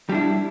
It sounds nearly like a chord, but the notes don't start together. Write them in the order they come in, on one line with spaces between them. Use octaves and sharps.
G3 D4 E4